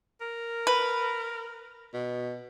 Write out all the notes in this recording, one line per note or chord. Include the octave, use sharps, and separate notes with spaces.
A#4
B4
B2